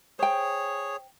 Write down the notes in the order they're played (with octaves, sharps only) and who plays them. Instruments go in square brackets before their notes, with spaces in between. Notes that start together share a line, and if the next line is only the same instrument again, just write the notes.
[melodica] G#4 C#5 [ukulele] C5 G5